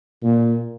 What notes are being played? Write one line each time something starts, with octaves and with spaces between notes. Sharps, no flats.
A#2